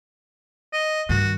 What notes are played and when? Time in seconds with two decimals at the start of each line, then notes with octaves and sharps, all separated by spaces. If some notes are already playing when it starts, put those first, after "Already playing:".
0.73 D#5
1.09 G2 D#3 F#4